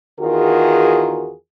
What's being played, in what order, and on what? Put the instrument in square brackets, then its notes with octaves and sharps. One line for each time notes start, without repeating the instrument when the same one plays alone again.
[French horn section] E2 D#3 F4 F#4 G#4 A#4